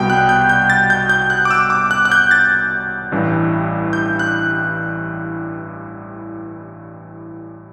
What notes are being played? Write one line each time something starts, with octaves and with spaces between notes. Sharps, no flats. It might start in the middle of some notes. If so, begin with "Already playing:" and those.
Already playing: C2 B2 G3 G5
F#6
G6
G6
A6
G6
G6
F#6
D6
E6
D6
F#6
F#6
G6
A6
A1 G2 E3 G3
G6
F#6